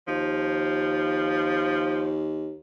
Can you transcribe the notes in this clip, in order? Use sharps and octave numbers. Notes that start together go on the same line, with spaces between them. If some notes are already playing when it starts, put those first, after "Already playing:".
D#2 F3